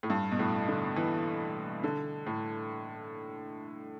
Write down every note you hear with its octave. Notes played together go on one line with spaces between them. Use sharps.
A2
G2
B2
A2
D3
E3
D3
A2